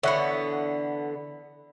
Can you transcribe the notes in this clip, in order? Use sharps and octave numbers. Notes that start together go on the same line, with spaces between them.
D3 E3 B3 C#5 E5 F#5